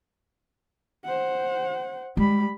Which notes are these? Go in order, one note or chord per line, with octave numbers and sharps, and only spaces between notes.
C5 F#5
G3 G#3 B5